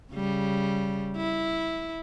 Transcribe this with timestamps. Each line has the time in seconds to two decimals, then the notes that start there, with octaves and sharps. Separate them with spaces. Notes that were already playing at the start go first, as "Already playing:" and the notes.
0.13 C#3 G3
1.17 E4